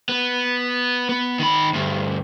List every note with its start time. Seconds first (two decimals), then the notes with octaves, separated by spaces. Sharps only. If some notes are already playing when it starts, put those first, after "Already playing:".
0.09 B3
1.09 B3
1.39 D#3 B5
1.73 D2 G2